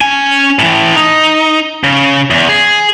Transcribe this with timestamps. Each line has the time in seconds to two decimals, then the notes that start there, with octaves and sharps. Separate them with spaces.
0.01 C#4 G#5
0.59 A2 E3
0.96 D#4
1.84 C#3
2.30 E2
2.49 G#4